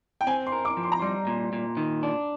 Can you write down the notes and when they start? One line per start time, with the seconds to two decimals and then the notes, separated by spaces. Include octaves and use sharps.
0.21 G5
0.27 C4 G#5
0.46 C6
0.52 A#4
0.65 D6
0.77 F3
0.83 C6
0.92 A#5
0.99 G3 C6
1.27 A#2
1.53 A#2
1.77 D#3
2.03 D4